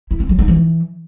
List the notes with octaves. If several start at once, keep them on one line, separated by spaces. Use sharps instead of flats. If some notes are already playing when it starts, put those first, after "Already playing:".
E4
C4
F#3
D#4
E3